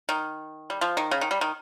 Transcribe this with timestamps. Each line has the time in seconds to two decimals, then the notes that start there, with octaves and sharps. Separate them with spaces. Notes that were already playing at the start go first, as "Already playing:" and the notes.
0.09 D#3
0.70 G3
0.81 F3
0.97 D#3
1.11 C#3
1.21 D#3
1.31 G3
1.41 D#3